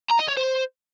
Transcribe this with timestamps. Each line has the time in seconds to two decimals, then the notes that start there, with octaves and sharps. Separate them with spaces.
0.10 A#5
0.19 D#5
0.28 C#5
0.37 C5